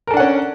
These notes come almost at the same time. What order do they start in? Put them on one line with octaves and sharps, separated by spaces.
A#4 A4 D4 F#5 C#4